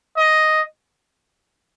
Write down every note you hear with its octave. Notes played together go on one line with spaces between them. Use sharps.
D#5